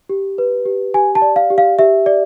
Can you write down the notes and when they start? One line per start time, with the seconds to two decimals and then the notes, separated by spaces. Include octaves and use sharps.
0.09 G4
0.38 B4
0.66 G4
0.94 G4 G#5
1.15 A5
1.22 D5
1.36 F5
1.50 G4
1.58 F5
1.79 G4 E5
2.06 D5